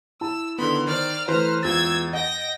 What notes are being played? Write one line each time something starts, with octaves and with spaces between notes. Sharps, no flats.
E4 A5 E6
D3 D#3 B3 B5 C6
D#3 C5 D5 F6
E3 A3 B4 C5 A#5 C6 F6
E2 G#3 F4 E6 G#6 A6
D#5 F#5 G5 A#6